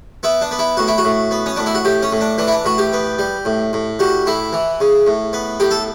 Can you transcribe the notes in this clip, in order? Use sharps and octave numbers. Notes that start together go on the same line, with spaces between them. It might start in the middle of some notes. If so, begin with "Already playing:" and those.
B3 E4
D4
B3
E4
A2 F#4
E4
F#4
A2
B3
C#4
A2 D4
E4
F#4
A2 G4
C#4
A2
D4
E3 D4
E4
D4
A2 F#4
G4
B3
G3
A2
A2
G3 F#4
A2 E4
E3
C#3
A2
B3
A2 G4
A4